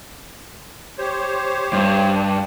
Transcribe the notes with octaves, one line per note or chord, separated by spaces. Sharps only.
G4 C5 C#5
G2